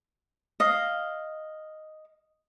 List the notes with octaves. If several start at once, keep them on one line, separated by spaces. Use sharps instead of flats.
D#5 F5